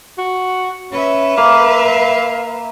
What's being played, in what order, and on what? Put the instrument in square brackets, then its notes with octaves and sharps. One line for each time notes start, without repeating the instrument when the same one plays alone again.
[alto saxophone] F#4
[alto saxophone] C#4 [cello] B4 E5
[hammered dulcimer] A#3 [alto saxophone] F5